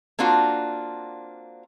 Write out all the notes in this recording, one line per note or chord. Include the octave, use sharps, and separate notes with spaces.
A#3 C4 D4 F4 F#4